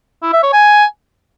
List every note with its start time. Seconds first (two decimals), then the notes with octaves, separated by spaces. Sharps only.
0.23 E4
0.33 E5
0.43 C#5
0.53 G#5